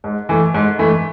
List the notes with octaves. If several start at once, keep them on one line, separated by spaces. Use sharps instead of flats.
G#2
E3 A3
G#2
E3 A3